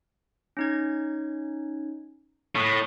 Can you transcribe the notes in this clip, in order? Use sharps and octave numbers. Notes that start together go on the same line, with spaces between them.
C#4 D#4 G#6
A2 C#6 D#6 F#6